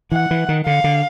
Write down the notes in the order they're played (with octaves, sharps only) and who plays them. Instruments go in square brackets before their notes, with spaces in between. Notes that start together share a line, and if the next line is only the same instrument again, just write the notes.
[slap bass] E3 [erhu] F#5
[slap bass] E3
D#3
[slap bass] D3 [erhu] F5
[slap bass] D3